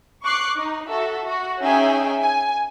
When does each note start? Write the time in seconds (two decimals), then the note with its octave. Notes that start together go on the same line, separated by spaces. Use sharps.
0.23 C#6 D6 F#6 C7
0.57 D#4
0.89 F#4 A4 E5
1.25 F#4
1.61 C#4 D#4 G#4 E5 G5 G#5
2.21 G#5